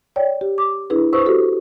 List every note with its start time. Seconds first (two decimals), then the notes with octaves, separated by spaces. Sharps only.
0.16 C#5 D5 G5
0.41 G4
0.58 D6
0.90 D4 E4 G#4 B4
1.13 B4 C5 C#6 D#6 E6
1.26 F#4 G4 A4